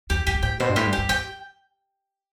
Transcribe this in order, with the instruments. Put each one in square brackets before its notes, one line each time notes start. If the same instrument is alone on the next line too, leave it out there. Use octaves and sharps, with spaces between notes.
[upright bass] E2 [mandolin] G4
[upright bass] F#2 [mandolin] G4
[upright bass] G2
[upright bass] A2 [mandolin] G5
[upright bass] B2 [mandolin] C5
[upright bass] G2
[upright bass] A2 [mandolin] G4
[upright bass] G2
[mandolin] G4
[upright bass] G2
[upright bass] F#2 [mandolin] G5